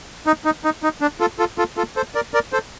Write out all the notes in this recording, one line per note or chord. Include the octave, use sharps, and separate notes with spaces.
D#4
D#4
D#4
D#4
D4
F4 A4
F4 A4
F4 A4
F4 A4
A4 C5
A#4 D5
A#4 D5
A4 C5